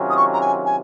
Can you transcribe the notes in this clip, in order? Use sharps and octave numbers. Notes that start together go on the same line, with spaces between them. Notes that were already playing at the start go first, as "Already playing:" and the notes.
Already playing: C3 D#3 F#3 C#4 F4
D#6
C#6
A#5
G#5
G#5